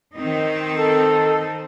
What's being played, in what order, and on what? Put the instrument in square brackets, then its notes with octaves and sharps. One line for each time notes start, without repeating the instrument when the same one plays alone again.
[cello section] D#3 C4 D#4
[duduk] A4